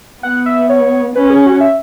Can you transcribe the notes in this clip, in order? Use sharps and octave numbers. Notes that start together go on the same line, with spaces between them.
B3 F#5
E5
C#5
C#4 B4
G#4
F#4
E5